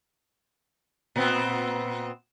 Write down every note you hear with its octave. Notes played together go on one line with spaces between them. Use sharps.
A#2 B3 C4